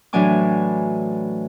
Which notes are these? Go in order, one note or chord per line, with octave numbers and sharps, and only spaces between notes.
A2 E3 F#3 D4 G#5 D6